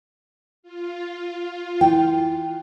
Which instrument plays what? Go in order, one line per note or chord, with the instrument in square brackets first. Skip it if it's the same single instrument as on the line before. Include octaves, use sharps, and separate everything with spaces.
[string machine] F4
[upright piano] E3 [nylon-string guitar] G5